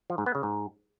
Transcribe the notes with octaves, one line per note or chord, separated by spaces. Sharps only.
F3
G#2
B3
C#3
G#2